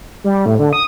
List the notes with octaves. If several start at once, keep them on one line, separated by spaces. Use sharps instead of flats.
G3
A2
D3
D#6